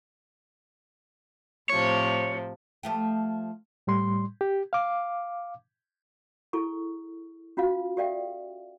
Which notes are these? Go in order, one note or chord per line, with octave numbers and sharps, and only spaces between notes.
A2 C3 F3 C#5
F3 A3 G4
A2 G3 C6
G4
F5 D6
E4 G#4 A4 C#6
C#4 F4 F#4 F5
G4 A4 D5 E5 F5 G5